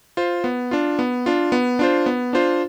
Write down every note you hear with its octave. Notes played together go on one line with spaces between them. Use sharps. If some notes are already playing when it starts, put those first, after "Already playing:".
F4 C5
B3
D4 F4
B3
D4 F4
B3
D4 F4 C5
B3
D4 F4 C5